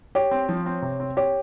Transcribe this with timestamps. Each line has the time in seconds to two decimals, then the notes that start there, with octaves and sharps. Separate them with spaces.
0.15 G4 C#5
0.31 C4
0.49 F3
0.66 C4
0.82 C3
1.00 C4
1.17 G4 C#5